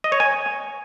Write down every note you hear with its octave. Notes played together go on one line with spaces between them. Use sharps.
D#5
C#5
G#5